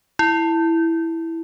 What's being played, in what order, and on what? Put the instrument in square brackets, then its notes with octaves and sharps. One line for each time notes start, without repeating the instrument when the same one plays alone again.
[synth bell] E4